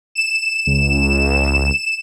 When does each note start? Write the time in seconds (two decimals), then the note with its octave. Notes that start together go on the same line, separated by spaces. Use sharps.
0.15 E7
0.67 C#2